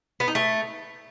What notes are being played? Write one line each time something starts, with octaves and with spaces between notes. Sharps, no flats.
B3
D#4
A3